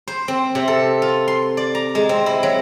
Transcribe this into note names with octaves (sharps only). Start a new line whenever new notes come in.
C5
C4
C3
A4
F4
C6
D5
A#5
G#3
C4
E4
F#3